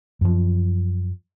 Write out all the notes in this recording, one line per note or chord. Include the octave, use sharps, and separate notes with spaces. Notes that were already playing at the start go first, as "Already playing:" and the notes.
F#2 F3